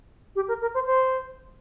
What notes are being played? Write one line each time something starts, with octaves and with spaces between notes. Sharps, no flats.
G4
A#4
A#4
C5
C5